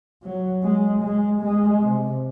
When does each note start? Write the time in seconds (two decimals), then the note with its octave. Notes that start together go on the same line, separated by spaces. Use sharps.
0.23 F#3
0.63 G#3
1.02 G#3
1.42 G#3
1.82 C3